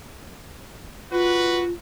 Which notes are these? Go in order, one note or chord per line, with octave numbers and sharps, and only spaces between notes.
F4 F#4 B4